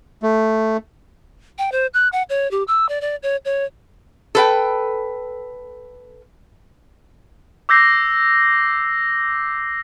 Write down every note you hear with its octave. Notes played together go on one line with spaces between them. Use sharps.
A3
G5
C5
F#6
F#5
C#5
G4
E6
D5
D5
C#5
C#5
A4 B4 G5
D6 E6 G6 A#6 C7